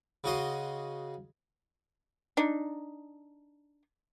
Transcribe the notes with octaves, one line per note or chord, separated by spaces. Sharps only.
C#3 F#4 D#5 C6
D4 D#4